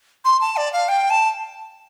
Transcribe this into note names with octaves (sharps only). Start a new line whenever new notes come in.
C6
A5
D5
F5
G5
A5